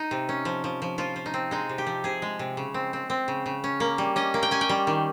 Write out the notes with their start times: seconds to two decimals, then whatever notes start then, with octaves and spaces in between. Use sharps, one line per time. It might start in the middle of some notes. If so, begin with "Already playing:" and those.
Already playing: D#4
0.11 C3
0.29 C#4
0.45 F3
0.64 F3
0.82 F3
0.98 F3 F4
1.16 F3
1.26 D#4
1.34 C4
1.51 G#3 D#4
1.69 C3
1.78 G4
1.87 F3
2.04 C3 G#4
2.22 G#3
2.39 C3
2.57 C#3
2.74 C4
2.93 C4
3.10 C4
3.28 C#3
3.46 C#3
3.64 C#4
3.80 A#3
3.98 G3
4.16 C#4 D#5
4.34 A#3
4.43 G5
4.51 C#4 G#5
4.61 G5
4.69 G3
4.87 D#3